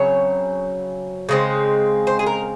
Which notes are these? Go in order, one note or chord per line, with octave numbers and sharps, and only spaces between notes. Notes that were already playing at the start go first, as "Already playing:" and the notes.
Already playing: C#3 F#3 C4 C#5
C#3 G#3 C4
C5
G#4
A#4